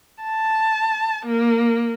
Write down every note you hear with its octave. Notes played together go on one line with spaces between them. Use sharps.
A5
A#3